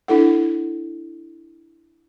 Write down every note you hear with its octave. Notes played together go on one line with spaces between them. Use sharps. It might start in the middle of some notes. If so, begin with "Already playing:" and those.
D4 E4 A4 F#5